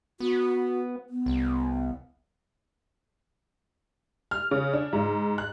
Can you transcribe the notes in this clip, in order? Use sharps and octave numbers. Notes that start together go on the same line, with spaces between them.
B3 F#4
B3
C2
F6
C#3
D4
G#2
F#6